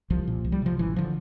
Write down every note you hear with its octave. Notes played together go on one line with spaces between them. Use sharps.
C2 F3
A#2
C2
G3
C3 F3
A1 E3
D3 F3